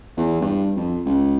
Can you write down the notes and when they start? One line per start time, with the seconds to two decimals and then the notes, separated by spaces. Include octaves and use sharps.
0.17 E2
0.41 G2
0.76 F2
1.06 C#2